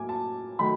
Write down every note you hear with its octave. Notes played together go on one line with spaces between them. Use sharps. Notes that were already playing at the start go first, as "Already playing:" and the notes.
Already playing: A2 F#3 A#3 G#5 D6
A5
D#3 F#3 A3 B5